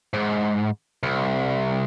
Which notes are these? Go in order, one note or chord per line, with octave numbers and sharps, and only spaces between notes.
G#2
C2